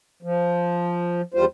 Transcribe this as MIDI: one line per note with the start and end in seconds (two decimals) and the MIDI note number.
0.23 1.22 53
1.34 1.45 40
1.34 1.45 55
1.34 1.45 65
1.34 1.45 72